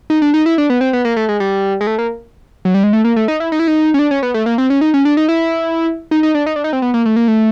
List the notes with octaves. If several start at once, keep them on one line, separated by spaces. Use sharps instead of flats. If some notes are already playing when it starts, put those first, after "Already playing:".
D#4
D4
D#4
E4
D4
B3
C4
B3
A#3
A3
G#3
G3
G#3
A3
A#3
F#3
G3
G#3
A3
A#3
A3
D#4
E4
D#4
E4
D#4
C#4
D4
C#4
B3
A3
A#3
C4
C#4
D#4
C#4
D4
D#4
E4
D#4
D#4
D4
D#4
D4
D#4
C4
B3
A#3
A3
A#3
A3